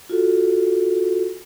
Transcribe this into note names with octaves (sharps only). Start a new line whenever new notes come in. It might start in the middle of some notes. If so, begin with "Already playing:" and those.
F4 F#4 A4